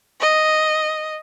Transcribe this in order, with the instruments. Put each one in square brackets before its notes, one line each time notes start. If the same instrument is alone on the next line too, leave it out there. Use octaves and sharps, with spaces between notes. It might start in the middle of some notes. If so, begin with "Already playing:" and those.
[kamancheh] D#5